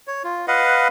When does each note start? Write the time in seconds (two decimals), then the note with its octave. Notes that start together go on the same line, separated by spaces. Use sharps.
0.07 C#5
0.24 F4
0.48 B4 D#5 F5 F#5